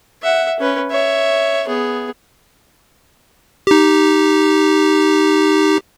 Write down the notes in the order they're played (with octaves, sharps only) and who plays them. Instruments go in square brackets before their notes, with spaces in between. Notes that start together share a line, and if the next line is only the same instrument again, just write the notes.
[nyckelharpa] E5 F#5
C#4 B4
C#5 E5
B3 G#4
[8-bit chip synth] D#4 G4